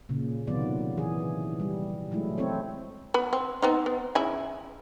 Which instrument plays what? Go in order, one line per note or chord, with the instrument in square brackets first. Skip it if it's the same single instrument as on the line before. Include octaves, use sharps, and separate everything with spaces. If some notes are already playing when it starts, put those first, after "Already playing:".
[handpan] A#2 C#3
C3 D#3 F#3 B3 F4 D5
E3 G#4
G3
F#3 G#3 A3 E4
C4 E4 A4 C#5
[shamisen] B3 B5
C4
B3 C4 D#4
B3
C#3 E4 G#5